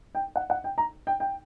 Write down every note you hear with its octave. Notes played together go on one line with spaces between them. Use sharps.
G5
F#5
F#5
G5
A#5
G5
G5